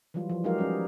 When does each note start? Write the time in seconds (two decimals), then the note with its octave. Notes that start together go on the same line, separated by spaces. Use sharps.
0.14 E3 F#3 G3 F4
0.29 F3
0.44 F#3 G#3 D#4 G4 A#4 F5
0.59 G3 C#4 G#4